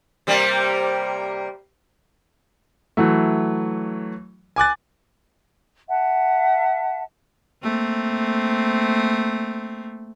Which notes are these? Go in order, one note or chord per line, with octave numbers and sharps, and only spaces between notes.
C3 G3 A#3
E3 F#3 A3
G#5 D6 F#6 A6
E5 F#5 A5
A3 A#3 C4